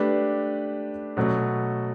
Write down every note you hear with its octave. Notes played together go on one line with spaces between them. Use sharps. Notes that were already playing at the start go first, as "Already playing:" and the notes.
Already playing: A3 D4 G4 B4
B2 F#3 A3